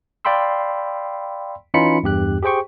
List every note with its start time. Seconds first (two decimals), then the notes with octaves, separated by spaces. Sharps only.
0.25 D5 F5 G5 B5 C6 E6
1.74 E3 C#4 D#4 F4 B5 C#7
2.03 E2 G2 G4 F#6
2.43 G4 G#4 C5 G5 C#6